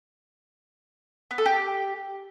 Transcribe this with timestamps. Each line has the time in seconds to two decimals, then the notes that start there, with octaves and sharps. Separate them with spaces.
1.31 B3
1.38 A4
1.46 G4